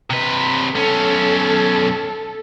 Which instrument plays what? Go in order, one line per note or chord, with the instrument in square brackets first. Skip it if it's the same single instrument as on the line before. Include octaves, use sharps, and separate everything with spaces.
[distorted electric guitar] C3 B4
[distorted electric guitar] B1 C#4 [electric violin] A4